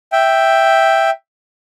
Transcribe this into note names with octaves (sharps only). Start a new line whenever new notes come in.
E5 G5